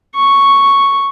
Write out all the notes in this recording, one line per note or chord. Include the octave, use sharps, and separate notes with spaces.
C#6